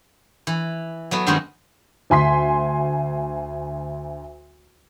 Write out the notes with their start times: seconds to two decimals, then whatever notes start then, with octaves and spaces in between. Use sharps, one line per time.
0.47 E3
1.11 F#3 A3 B3
1.27 G2 D#3 F#3 G#3 C4 C#4
2.10 D2 G#5 C6 B6